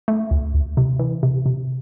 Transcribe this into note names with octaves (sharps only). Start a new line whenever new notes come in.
A3
D2
D2
C3
E3
C3
C3